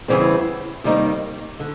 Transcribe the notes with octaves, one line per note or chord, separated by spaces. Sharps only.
E2 C#3 E3 G3 C4
C3 D#3 G3 A#3 D#4
D3